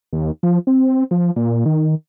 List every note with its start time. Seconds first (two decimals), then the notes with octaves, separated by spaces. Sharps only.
0.13 D#2
0.43 F3
0.67 C4
1.11 F3
1.36 A#2
1.66 D#3